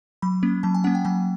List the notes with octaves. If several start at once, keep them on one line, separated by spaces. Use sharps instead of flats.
F#3 B5
A#3 C#4
F#3 A5
G#5
A#3 C#4 F#5
G5
F#3 G#5